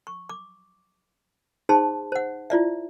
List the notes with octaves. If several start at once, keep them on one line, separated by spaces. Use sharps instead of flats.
C#6
D6
D#4 G#4 C5 A5 C6
C5 F#5
E4 F4 D5 E5